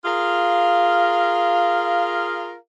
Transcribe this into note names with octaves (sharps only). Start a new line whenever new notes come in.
F4 G#4 A#4 F5